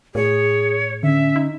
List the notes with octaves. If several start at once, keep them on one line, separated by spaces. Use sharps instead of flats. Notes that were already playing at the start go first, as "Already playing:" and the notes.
A2 G#4 C#5
D3 C#4 E5
D#4